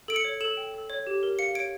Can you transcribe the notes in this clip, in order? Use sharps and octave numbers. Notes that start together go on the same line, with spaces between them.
A4 D7
C#7
C#5
A4 E7
G5
A4
C#5
G4
A#4
F5 C#7
C#5 D7